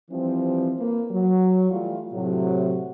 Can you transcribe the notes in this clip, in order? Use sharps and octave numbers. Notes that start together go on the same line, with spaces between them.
E3 F3 G3 C4
A#3 B4
F#3
E3 G3 A3 F4
A2 C3 F#3